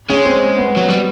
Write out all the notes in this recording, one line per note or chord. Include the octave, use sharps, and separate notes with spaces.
G#3 C#4
C4
B3
F#3
G3